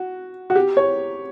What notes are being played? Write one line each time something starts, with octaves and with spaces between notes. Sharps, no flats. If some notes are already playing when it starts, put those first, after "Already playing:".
Already playing: F#4
F#4
G4
C#5